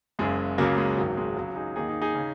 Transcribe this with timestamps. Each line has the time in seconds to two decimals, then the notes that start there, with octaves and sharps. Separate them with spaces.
0.19 F#1 F#2 C#3 G#3
0.58 C#2 C#3 F#3 A#3
0.78 G#3
0.97 G#1 G#2 D#3 F#3
1.17 G#3
1.37 C#2 C#3 F#3
1.56 D#4 G#4
1.76 D#2 D#3 D#4 G#4
1.88 D#4 G#4
2.01 D#4 G#4
2.15 C#3